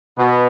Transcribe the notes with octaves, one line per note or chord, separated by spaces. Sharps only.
B2 B3